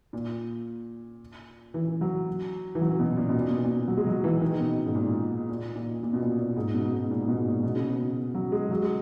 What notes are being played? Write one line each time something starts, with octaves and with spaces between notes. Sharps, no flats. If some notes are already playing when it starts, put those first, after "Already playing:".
A#2
E3
F#3
E3
F#3
B2
A#2
B2
A#2
B2
A#2
F#3
G#3
F#3
E3
D#3
B2
G#2
A#2
A#2
A#2
A#2
B2
A#2
A#2
G#2
B2
G#2
A#2
B2
G#2
A#2
B2
C#3
B2
F#3
G#3
F#3
G#3